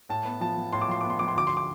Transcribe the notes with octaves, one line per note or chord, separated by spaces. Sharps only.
A2 A5
B3
F3 A5
F3
A2 C6
D6
F3 C6
B3 D6
C6
F3 D6
C6
D2 D6
C6
D6